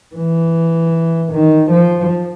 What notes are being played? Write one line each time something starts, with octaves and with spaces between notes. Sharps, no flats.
E3
D#3
F3